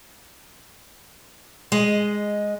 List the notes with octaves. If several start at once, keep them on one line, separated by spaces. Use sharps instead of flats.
G#3 D#5